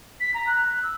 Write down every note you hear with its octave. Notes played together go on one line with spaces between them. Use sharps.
B6
A#5
F#6
E6